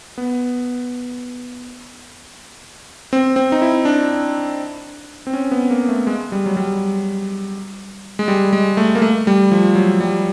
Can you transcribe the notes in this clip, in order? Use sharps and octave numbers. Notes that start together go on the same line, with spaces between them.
B3
C4
C4
D#4
E4
D4
C4
C#4
B3
A#3
A3
G#3
G3
F#3
G3
G#3
G3
G#3
A3
A#3
A3
G3
F3
F#3
G3